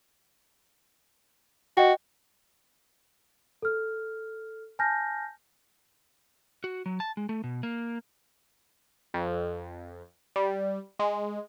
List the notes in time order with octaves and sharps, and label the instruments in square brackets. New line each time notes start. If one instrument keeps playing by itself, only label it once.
[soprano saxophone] F#4 [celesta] D#5 G5
[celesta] A4 F6
G#5 A5 F6 G6 A#6
[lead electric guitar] F#4
F#3
A5
G#3
A3
B2
A#3
[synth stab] F2
G3
G#3